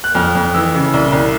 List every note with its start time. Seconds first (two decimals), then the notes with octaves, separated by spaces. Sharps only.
0.04 F#6
0.15 F2 F6
0.35 F2
0.54 E3 E6
0.74 C#3
0.94 C2
1.12 C2